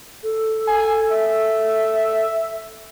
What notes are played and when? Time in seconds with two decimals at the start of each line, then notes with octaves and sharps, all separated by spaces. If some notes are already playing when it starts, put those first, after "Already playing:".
0.23 A4
0.68 G#5
1.12 E5